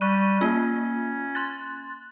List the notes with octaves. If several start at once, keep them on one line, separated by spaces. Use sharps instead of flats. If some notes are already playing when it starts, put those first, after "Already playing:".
G3 C#6 F#6 D#7
A#3 C#4 F4
C6 F#6 A6